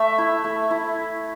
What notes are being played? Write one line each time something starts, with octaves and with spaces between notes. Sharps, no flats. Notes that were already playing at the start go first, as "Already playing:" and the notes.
Already playing: A3 E5
E4
A3
E4